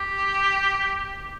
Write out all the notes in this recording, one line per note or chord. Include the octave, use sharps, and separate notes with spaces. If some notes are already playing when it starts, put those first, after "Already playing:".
Already playing: G4